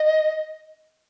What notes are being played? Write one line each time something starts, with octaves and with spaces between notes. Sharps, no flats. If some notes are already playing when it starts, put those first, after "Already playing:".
Already playing: D#5